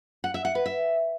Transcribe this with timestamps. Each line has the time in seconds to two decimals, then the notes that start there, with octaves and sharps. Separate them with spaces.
0.24 F#5
0.34 E5
0.45 F#5
0.55 B4
0.66 E5